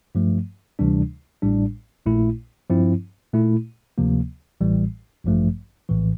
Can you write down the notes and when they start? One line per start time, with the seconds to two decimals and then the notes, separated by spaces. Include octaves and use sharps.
0.15 G2 F3 A3
0.79 D2 C3 E3 G3 D4
1.42 A1 A2 G3 D4
2.06 A#1 A#2 A3 E4
2.70 G2 F3 C4 E4
3.34 A#2 A3 E4
3.98 D2 C3 F3 A#3
4.61 A1 A2 E3 G3
5.25 A1 G2 F3 A3
5.89 A#1 A2 E3